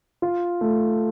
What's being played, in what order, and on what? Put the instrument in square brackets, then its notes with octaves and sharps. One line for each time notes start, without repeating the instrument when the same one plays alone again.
[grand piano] F4
A3